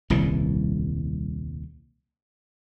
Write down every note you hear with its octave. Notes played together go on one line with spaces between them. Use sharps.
D#1 C2 A2 E3